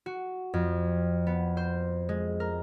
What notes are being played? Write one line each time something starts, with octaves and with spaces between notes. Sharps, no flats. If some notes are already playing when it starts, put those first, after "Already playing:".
F#4
F2
B3
C5
G#3
A#4